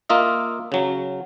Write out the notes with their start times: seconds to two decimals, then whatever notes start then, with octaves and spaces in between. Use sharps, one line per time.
0.09 A#3 F4 D#5 E5
0.72 C#3 F#3